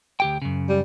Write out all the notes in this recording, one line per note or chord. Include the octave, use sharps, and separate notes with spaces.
D2 G4 G5
F#2 C#3
G3